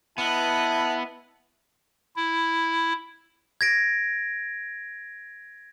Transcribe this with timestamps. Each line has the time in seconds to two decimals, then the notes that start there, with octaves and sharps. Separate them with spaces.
0.18 B3 E4 D#5 A5 F#6
2.16 E4
3.61 G#6 A#6 D7